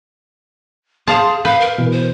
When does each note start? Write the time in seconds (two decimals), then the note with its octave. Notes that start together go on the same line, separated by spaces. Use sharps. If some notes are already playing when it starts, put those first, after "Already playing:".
1.07 G#4 C5 F5 A5 C6
1.45 B4 F5 G6
1.60 A#4
1.78 B2 E3
1.92 C5